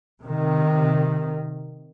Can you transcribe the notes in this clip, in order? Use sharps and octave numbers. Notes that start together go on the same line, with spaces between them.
C3 D#3